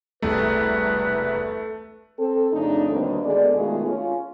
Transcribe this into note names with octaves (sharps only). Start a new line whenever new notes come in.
E1 C2 A3 B4
C4 A4
F2 C#3 A3 D4 D#4
D#2 B2 D3 G3 C4 D4
D2 G#3 B3 A4 D5
B2 D#3 G#3 A3 F4 G#4
C#4 F4